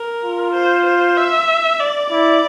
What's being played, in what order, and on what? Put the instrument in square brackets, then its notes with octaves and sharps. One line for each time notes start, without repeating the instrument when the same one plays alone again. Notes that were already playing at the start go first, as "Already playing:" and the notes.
Already playing: [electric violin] A#4
[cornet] F4
[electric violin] C5
C5
E5
D5
[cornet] E4 [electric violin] D5